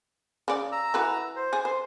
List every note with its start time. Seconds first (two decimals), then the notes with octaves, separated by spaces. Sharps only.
0.48 C#3 D5
0.72 A#5 E6
0.94 E3 F#4 B4
1.36 C5
1.53 G#4
1.65 C5 C6